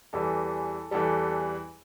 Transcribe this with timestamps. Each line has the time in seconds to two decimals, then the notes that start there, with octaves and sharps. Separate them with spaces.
0.13 E2 E3 G3 A4
0.91 E2 E3 G3 A4